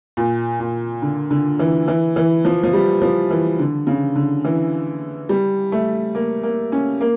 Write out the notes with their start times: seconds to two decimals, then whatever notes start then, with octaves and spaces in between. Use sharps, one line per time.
0.17 A#2
0.60 A#2
1.02 D3
1.31 D3
1.59 E3
1.88 E3
2.16 E3
2.45 F3
2.63 F3
2.73 G3
3.02 F3
3.30 E3
3.59 D3
3.87 C#3
4.16 D3
4.44 E3
5.29 G3
5.72 A3
6.15 A#3
6.43 A#3
6.72 C#4
7.01 A#3